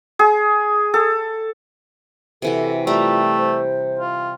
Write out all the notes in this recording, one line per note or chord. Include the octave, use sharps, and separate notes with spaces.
G#4
A4
C3 E3 F#4 A4
G3 A3 F4 G4 A#5
C5
F4